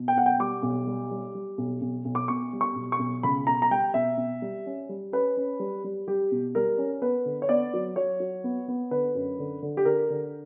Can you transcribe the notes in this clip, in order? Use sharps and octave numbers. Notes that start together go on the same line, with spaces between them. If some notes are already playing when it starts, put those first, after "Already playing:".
Already playing: B2
G5
B1 F#5
G5
G3 D6
B1
G3
G3
G3
B1
B1
B1
D6
B2 C#6
G3
C#6
B1
C#6
B1
C#2 B5
B2 A#5
A#5
G3 G5
B2 E5
B2
G3
C#4
G3
C#4 B4
C#4
G3
G3
G3 G4
B2
G3 A#4
C#4
B3 B4
D3
C#5
B3 D5
F#3
F#3 C#5
F#3
B3
B3
D3 B4
F#2
D3
D3
G4
D3 A#4
D3